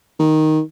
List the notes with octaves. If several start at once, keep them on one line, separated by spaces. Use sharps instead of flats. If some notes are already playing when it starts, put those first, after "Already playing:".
D#3